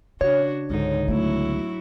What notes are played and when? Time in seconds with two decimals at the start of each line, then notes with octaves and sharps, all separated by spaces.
0.21 C#3 D4 F#4 C#5
0.70 C#2 G#2 D3 D#4
1.08 F#3 A3 B3 E4 F#4